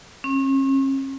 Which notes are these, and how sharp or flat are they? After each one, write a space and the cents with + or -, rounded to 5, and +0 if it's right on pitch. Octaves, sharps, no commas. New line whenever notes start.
C#4 -40